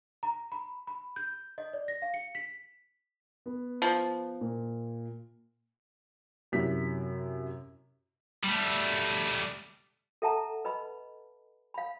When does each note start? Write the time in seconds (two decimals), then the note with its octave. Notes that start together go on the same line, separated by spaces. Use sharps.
0.23 A#5
0.52 B5
0.87 B5
1.16 G6
1.58 D#5
1.73 D5
1.88 A#6
2.02 F5
2.14 C#7
2.35 B6
3.46 B3
3.82 F3
4.41 A#2
6.52 F#2 C3 E4 B6
8.44 G3 A3
10.22 A4 E5 F#5 A5 A#5
10.65 B4 D#5 B5
11.74 F5 B5